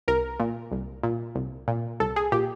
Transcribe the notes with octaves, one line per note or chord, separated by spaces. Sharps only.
C2 A#4
A#2
C2
A#2
C2
A#2
C2 A4
G#4
A#2 G4